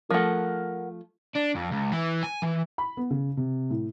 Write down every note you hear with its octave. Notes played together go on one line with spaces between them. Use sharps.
F3 A3 A#4 F#5
D4
F2
C#2
E3
G#5
E3
B5
B3
C#3
C3
A2